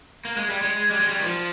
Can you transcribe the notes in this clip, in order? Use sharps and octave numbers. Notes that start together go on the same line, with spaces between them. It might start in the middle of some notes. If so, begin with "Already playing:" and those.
A#3
G#3
G3
G#3
G3
G#3
G3
D#3
F3